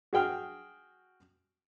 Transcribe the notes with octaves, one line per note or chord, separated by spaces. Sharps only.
F#4 G#4 G5 F6